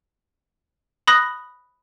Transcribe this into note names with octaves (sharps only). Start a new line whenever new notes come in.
B5 D#6 F#6 A#6